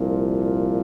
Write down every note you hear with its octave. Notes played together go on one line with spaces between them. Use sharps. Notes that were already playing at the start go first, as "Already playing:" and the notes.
Already playing: C2 A#2 F3